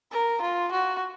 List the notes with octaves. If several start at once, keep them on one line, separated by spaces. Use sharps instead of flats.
A#4
F4
F#4